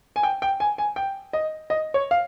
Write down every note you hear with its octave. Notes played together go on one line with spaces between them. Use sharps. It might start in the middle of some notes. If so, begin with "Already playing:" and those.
G#5
G5
G5
G#5
G#5
G5
D#5
D#5
C#5
F5